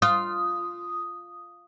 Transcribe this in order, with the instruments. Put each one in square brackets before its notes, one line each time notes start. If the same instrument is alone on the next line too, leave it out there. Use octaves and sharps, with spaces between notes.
[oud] F4 [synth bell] D#6